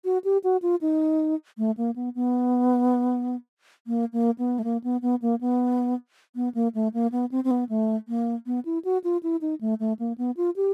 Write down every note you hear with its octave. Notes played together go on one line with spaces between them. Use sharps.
F#4
G4
F#4
F4
D#4
A3
A#3
B3
B3
A#3
A#3
B3
A3
A#3
B3
B3
A#3
B3
B3
A#3
A3
A#3
B3
C4
C4
B3
A3
A#3
B3
E4
F#4
F4
E4
D#4
A3
A3
A#3
B3
F4
G4